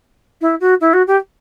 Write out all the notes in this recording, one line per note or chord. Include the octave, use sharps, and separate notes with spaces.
E4
F#4
E4
F#4
G4